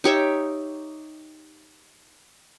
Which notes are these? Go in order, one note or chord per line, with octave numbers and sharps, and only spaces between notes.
D#4 G4 C#5 E5